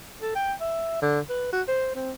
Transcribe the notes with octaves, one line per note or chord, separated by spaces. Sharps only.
A4
G5
E5
D3
B4
F#4
C5
C4